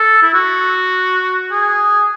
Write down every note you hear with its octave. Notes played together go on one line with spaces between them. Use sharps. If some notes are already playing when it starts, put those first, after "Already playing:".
Already playing: A4
E4
F#4
G#4